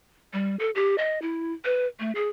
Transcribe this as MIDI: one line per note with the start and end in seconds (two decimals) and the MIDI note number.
0.33 0.56 55
0.59 0.71 69
0.75 0.96 67
0.98 1.20 75
1.22 1.52 64
1.65 1.86 71
2.00 2.12 57
2.15 2.29 68